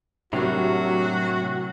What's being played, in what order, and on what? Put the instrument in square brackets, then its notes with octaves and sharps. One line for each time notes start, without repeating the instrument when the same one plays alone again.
[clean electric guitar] A2 C3 [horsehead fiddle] F#3 [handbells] D4 G4 A#4 [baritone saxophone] F#4